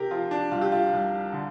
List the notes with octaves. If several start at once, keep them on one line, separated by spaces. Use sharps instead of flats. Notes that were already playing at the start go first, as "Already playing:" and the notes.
Already playing: C3 G4 A#4
F3 F4
D4
C2 F4
G4
F4
C2
D3